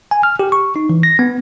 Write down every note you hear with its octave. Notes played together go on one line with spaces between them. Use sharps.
G#5
F6
G4
C#6
D#4
E3
A#6
B3